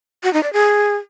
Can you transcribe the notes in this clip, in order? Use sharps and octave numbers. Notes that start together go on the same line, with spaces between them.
F#4
D#4
D5
G#4